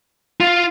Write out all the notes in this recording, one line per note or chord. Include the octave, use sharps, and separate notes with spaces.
F4